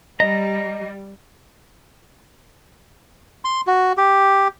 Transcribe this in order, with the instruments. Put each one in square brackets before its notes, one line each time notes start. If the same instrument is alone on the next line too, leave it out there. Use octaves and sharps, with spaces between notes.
[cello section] G3 [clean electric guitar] D#5 [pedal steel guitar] A#5
[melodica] C6
F#4
G4